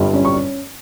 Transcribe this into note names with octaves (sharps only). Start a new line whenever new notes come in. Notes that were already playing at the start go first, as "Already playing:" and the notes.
Already playing: G1 G2 G3
C#4
C#6